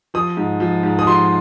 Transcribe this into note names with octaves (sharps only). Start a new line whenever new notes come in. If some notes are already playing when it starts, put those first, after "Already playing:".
F3 D#6
G#2
F3
G#2
D#6
F3 C6